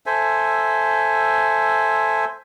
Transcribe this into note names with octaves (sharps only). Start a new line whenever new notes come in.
A4 C5 E5 G#5